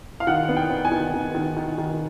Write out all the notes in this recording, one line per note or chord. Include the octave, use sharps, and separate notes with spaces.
F5
D#3 F#5
B3
G5
B3
G#5
D#3
D#3
D#3
D#3
D#3